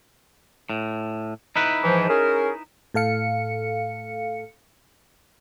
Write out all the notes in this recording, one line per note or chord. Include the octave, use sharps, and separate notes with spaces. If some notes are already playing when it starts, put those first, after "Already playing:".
A2
D#4 E4 B4
G#2 E3 F3
C#4 G#4 A#4
A2 A4 F5 C#7